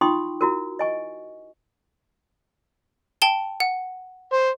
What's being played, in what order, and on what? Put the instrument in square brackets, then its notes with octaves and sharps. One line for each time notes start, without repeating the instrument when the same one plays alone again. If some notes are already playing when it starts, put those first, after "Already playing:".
[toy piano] D#4 F4 G5 C6 C#6 D#6
E4 F#4 A#4
D#5 G#5 C#6
[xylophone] G5 A5 G7
F#5
[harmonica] C5